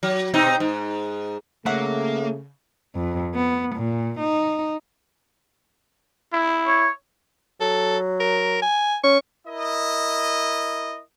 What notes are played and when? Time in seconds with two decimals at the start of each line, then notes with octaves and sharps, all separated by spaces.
0.03 F#3
0.34 B2 C4 D#4
0.60 G#2
1.66 C#3 F#3 A3 A#3 E5 F#5
2.95 F2
3.35 B3
3.75 A#2
4.19 D#4
6.33 E4
6.67 C#5
7.61 F#3 A4
8.20 A#4
8.62 G#5
9.04 C#4 C#6
9.48 E4 A#4 D#5